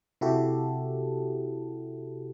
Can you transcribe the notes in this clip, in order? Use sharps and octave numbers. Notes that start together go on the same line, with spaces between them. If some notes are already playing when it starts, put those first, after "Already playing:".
C3 E4 F#4 G4 A4